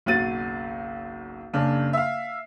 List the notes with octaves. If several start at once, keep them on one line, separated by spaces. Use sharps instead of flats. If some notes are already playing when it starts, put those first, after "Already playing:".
F#1 B1 F#4 F#6 A6 D#7
F#1 C#3 D4
E5 F5